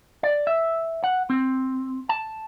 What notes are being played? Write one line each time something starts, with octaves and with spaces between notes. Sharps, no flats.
D5
E5
F#5
C4
A5